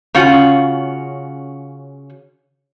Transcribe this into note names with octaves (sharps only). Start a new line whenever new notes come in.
C#3 C#4 F4 F#4